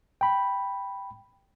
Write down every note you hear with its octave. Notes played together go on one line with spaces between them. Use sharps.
G5 B5